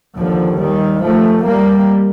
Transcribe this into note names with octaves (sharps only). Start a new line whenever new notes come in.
D#2 D3 F3
D#3 G3
F3 A3
G3 A#3